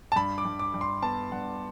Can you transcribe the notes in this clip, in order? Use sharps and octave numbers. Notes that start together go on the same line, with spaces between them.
A5
G2 B5
D6
G2
D6
G2
C6
B3 A5
G2 F#5